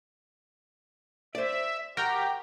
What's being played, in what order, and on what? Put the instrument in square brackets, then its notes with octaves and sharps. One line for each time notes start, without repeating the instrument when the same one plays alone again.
[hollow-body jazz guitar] C5 D5 [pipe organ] E5
[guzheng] F#4 [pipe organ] G4 [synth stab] A#4 G5 A#5